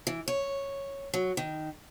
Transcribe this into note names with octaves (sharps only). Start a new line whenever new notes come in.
E3
C#5
F#3
D#3